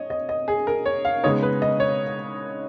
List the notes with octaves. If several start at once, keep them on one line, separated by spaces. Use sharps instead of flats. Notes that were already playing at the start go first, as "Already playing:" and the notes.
Already playing: C#5 D#5
D#5
D#5
G#4
A#4
C#5
F5
C#3 G#3 B3 D#4 C#5
B4
D#5
C#5